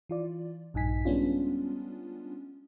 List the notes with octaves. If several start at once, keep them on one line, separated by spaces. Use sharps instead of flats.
E3 F4 D5
A#1 G2 D#4 G#5 B6
G3 G#3 B3 C#4 D4 F4